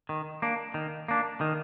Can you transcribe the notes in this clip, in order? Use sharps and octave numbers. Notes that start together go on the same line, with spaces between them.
D#3
A#3 D4
D#3
A#3 D4
D#3